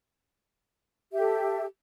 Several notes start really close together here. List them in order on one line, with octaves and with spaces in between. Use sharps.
G4 E5 A4